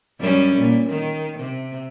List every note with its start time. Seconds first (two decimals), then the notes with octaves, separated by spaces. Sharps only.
0.19 F#2 G3 C#4
0.57 A#2
0.89 D#3
1.40 C3